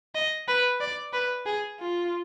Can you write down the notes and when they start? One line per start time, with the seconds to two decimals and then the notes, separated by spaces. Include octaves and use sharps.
0.15 D#5
0.48 B4
0.81 D5
1.13 B4
1.46 G#4
1.80 F4